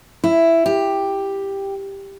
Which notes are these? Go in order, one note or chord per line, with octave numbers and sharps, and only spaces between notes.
E4
G4